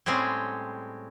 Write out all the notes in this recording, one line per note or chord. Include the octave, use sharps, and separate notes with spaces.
A2 G3 G#3 C4 C#4